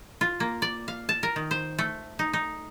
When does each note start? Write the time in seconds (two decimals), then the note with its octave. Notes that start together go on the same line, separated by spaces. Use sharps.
0.21 F4
0.40 A#3
0.62 D5
0.88 F5
1.09 A5
1.23 A#4
1.36 D#3
1.51 C5
1.79 A3
2.19 D#4
2.33 D#4